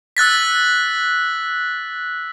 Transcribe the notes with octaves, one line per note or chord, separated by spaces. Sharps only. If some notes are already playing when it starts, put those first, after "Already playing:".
E6 F#6 A6 B6